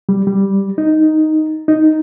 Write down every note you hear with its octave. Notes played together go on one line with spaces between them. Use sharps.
G3
G3
D#4
D#4